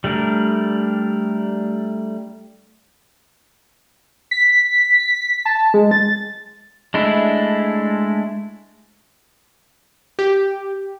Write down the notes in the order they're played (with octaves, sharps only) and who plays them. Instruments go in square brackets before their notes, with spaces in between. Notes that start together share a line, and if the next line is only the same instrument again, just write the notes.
[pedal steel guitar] G3 A3 D4 A#4
[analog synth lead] B6
A5
G#3
A6
[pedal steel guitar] G#3 A3 D4 E4
[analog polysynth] G4